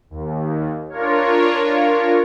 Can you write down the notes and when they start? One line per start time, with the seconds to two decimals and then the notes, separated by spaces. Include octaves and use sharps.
0.10 D#2
0.90 D4 F4 A#4 C#5